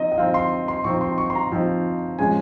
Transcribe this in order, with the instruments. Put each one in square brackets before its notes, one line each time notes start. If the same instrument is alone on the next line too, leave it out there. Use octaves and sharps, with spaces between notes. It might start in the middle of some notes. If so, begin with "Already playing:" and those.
Already playing: [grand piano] F3 C4 D#4 D#5
D#5
F3 C4 D#4 F5
C6
C6
F3 C4 D#4 C#6
C6
C#6
C6
A#5
F3 C4 D#4
F3 G#3 C#4 G#5